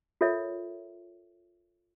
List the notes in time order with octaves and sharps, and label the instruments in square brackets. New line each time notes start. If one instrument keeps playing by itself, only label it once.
[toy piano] F4 A4 A#4 C#5 E5